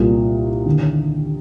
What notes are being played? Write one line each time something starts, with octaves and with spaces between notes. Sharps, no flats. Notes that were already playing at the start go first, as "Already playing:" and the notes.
Already playing: C2 A#2
D#2 D3